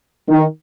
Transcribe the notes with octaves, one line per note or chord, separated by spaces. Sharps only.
D#3